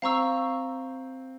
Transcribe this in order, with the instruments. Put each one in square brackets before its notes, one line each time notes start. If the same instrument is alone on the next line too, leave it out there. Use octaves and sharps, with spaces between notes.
[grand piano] C4 [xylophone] F5 A#5 C#6 E6